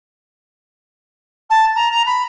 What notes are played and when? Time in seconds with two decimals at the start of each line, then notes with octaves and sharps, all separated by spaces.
1.50 A5
1.75 A#5
1.91 A#5
2.06 B5